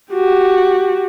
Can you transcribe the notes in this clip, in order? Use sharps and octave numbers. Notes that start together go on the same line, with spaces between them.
F#4 G4